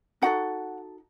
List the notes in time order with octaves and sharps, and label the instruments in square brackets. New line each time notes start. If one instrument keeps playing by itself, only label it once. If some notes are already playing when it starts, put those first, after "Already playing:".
[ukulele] D#4 F#4 A4 F#5